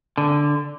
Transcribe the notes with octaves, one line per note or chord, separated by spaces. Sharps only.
D3